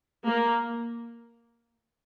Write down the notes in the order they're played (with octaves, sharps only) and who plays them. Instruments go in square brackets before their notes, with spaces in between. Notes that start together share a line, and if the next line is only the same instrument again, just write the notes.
[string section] A#3